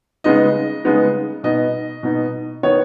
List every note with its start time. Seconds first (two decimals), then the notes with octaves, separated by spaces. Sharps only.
0.24 C#3 G#3 B3 D#4 D#5
0.85 C#3 G#3 B3 D#4
1.43 B2 B3 D#4 D#5
2.03 B2 B3 D#4
2.63 D#3 B3 D#4 C#5